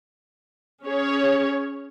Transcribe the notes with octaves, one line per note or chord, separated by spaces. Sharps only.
C#4 G#4 C#5